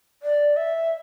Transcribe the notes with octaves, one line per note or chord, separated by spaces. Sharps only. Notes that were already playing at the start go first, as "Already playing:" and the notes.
D5
E5